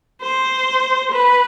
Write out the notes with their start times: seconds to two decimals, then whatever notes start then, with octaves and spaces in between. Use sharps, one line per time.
0.22 C5
1.11 B4